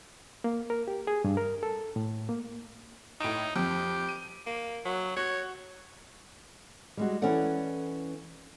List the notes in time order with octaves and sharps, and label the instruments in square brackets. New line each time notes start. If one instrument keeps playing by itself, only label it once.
[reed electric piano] A#3
A#4
G4
G#4
G2
A#4
A4
A2
A#3
[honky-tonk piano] A2 D7 E7 [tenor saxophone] D#4
[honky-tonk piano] F2 [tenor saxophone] G4
[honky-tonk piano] D#7
[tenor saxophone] A#3
F#3
[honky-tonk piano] F#4 [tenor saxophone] C#5
[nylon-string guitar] G3 G#3 F#4
E3 C#4 A4 D5 F#5